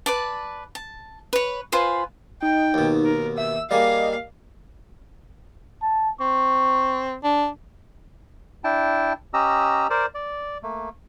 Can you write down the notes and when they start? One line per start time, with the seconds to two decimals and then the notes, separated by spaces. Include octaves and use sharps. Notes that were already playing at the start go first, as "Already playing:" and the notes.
0.06 B4 D5 A5
0.75 A5
1.33 B4 C#5
1.72 F4 B4 C5 G#5
2.42 D#4 G5
2.74 D#2 B2
3.05 A#4
3.38 E5 E6
3.71 G3 A#3 G#4 D#5 F5
5.82 A5
6.20 C4 C#6
7.23 D4
8.64 D4 E4 G5 A5
9.34 C#4 G4 D#5 A#5 E6
9.90 A#4 C5 D5
10.14 D5
10.63 A3 A#3